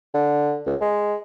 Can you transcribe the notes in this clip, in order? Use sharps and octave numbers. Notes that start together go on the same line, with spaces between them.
D3
C#2
G#3